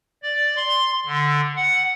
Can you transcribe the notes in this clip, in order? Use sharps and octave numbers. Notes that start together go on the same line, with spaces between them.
D5
C6
D3
F#5